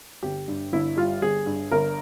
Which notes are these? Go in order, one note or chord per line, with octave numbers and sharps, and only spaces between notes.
G1 G4
G2
G1 E4
G3 F4
G1 G#4
G2
G1 A#4